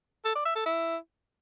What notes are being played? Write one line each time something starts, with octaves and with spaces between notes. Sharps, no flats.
A4
D5
E5
A4
E4